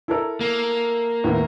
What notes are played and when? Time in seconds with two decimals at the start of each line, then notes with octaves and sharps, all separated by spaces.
0.08 E4 A4 A#4
0.41 A#3
1.24 D#2 A2 B3